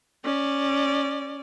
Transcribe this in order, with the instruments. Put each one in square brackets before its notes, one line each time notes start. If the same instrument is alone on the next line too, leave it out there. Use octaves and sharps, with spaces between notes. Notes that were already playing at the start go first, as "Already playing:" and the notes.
[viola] C#4 D5